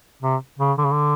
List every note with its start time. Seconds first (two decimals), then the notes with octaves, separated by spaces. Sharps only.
0.23 C3
0.59 C#3
0.78 D3
0.85 C#3
0.92 D3